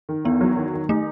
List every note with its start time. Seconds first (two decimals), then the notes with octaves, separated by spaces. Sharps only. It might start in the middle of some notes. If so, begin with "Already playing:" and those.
0.09 D#3
0.25 E2 B3
0.41 F#3
0.57 D#3
0.73 D#3
0.89 A3 D#4